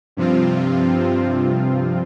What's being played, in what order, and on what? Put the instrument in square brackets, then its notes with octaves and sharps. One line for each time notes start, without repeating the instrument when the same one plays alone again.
[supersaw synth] G2 C3 F3 C4 F4